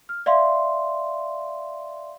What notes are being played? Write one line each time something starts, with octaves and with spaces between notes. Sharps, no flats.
F6
D5 E5 F5 C6